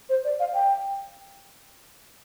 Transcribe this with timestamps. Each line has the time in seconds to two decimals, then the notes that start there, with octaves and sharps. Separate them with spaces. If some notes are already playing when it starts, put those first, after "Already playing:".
0.09 C5
0.24 D5
0.40 F5
0.54 G5